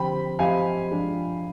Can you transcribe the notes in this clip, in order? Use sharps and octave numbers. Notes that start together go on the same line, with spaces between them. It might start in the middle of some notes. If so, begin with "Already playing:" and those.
Already playing: D3 F3 C4 G4 C5 G5 B5
F3 C4 G4 C5 D#5 F5 G#5
F3 G#3 D4 F4 G#4